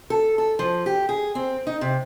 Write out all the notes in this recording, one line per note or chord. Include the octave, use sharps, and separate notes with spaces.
A4
A4
F3
G4
G#4
C4
D#4
C3